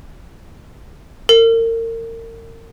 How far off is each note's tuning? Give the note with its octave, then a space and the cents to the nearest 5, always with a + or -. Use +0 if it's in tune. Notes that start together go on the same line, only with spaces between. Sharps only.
A#4 -35